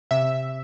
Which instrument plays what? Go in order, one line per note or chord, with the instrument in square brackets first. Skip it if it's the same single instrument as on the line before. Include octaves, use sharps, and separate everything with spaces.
[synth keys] C3 E5